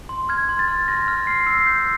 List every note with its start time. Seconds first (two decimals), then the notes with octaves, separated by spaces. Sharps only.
0.09 C6
0.29 F6 G#6
0.49 C6
0.59 A6
0.68 F6
0.88 C6 A#6
1.08 F6
1.27 C6 C7
1.46 E6 C7
1.66 G6